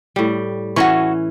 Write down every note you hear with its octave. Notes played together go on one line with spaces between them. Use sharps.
A2 G3
E3 C#4 F#4 A#4 C#6